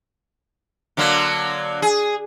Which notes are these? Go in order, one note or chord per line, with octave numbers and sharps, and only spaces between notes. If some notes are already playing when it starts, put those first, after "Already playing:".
D3 F#3 A#3
G#4